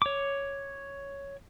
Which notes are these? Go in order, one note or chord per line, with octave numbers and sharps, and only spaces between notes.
C#5 D6